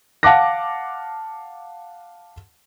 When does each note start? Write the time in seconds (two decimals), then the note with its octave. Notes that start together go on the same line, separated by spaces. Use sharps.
0.23 F5 F#5 A5 D6 F#6 A#6